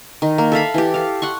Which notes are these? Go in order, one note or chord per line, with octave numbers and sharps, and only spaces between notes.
D#3
A#3
A4 E5 F5 B5
E3 G4
A4 F5
F#5 C6 C#6